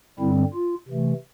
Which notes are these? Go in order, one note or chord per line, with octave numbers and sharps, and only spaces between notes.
G2 D3 G3 C4 E4
F4
C3 E3 A3